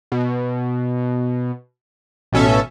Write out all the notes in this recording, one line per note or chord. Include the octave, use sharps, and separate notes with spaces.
B2
A1 B2 C#4 A4 E5